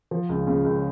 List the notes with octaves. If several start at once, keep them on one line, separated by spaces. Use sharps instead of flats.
F3
C#2
C#3
C#2